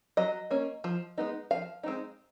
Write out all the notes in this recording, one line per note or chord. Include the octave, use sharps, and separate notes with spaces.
F#3 D#5
A#3 C#4
F3
G#3 B3 D#4
F3 F5
G#3 C4 D#4